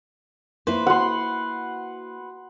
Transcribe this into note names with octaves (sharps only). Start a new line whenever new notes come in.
A#3 E4 B4 C5
F#4 F#5 C6